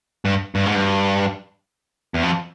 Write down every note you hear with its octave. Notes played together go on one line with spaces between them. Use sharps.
G2
G2
G#2
G2
E2
F2